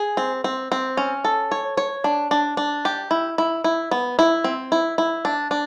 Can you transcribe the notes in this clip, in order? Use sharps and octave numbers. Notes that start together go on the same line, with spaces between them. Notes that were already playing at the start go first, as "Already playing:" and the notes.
Already playing: G#4
C4
C4
C4
C#4
A4
C#5
C#5
D4
D4
D4
G4
E4
E4
E4
B3
E4
C4
E4
E4
D4
D4